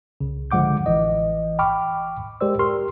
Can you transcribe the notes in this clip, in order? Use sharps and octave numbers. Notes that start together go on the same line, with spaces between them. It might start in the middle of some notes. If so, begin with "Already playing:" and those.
C2 C#3
D3 F3 G#3 F#5 D6 G6
A1 E3 D#5
G5 B5 C#6 D6 F6
G#3 G4 A#4 C5 D5 E6
G4 A#4 C6 C#6 F6